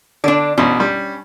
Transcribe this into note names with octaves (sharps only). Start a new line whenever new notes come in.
D3 D4 D5
A1 B2 C#4
G3